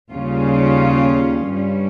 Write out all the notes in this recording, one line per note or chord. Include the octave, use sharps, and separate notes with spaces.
D#2 C#3 G3 C#4 F4
G2 G3 C#4